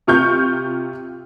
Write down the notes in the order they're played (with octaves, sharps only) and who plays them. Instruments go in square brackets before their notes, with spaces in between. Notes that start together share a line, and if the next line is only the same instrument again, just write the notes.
[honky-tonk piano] C3 F4 C#6 F6 G6